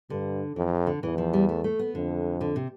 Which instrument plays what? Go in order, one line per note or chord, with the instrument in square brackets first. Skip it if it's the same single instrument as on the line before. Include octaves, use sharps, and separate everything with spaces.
[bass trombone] G2 [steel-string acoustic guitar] D3
[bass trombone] F2 [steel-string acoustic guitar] E3
[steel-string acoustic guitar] D3
[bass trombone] E2 [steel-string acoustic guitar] E3
[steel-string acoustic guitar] F3
G3
A3
A3
B3
[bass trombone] F2 [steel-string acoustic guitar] D3
[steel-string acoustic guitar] D3
C3